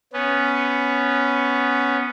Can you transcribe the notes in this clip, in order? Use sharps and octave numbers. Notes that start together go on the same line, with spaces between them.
B3 C#4